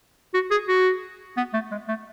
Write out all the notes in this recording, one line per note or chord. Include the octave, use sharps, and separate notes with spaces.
F#4
G#4
F#4
B3
A3
G#3
A3